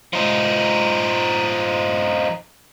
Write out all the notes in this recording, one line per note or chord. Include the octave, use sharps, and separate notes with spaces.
F3 D#4